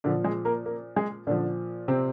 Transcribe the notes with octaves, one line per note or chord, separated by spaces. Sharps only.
A#2 D3 F3 D4
G#3 G#4
A#3 A#4
A#3 A#4
G#3 G#4
A#2 D3 F3 D4
C3 C4